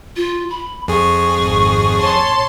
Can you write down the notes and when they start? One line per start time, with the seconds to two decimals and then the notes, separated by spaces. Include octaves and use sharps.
0.17 F4
0.50 B5
0.88 F2 G#4 C#6
1.35 G#1
1.97 C#5 A5 C6